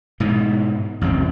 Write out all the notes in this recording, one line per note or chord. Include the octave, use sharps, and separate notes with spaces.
G#2 B2 E3
A1 E2 C3 C4